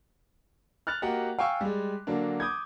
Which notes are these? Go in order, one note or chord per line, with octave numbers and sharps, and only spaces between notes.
F6 F#6 A6 F7
A#3 F#4 G4 A#4 D#5 F#5
F5 G5 G#5 C#6 E6
G3 G#3
D3 F#3 A#3 D4
D6 D#6 G6 G#6